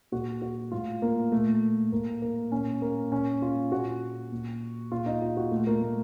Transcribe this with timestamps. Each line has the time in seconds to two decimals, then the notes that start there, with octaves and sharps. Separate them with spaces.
0.12 A#2 F#4
0.42 F#4
0.72 A2 F4
1.02 A#3
1.32 A#2 A3
1.92 A2 A#3
2.22 A#3
2.52 A#2 C#4
2.82 A#3
3.12 A#2 C#4
3.42 F4
3.72 A#2 F#4
4.32 A#2
4.92 A#2 F4
5.06 D#4
5.22 F4
5.37 F#4
5.51 A#2 A3
5.67 A#3
5.82 A3